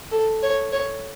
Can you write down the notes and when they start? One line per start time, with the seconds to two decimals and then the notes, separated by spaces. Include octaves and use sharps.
0.11 A4
0.43 C#5
0.72 C#5